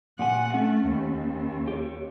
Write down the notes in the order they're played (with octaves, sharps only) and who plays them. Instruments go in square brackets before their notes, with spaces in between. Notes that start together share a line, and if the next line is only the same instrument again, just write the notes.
[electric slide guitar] A#2 G4 G#5 [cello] F#5
[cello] A3 [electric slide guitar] C#4
[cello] D#2
[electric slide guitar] G4 C#5